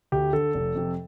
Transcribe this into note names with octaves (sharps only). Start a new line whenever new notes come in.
D2 G4
D3 A4
F1
F2 C3